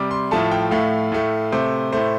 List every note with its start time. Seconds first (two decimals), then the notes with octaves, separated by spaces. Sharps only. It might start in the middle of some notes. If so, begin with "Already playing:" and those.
Already playing: C3 G3 D6
0.11 C6
0.31 A2 F3 A3 A5
0.51 G5
0.71 A2 A3 F5
1.12 A2 A3
1.52 C3 A3 C5
1.93 A2 A3 C5